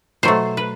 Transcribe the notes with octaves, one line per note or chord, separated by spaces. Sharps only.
B2 F#3 A3 C5
B4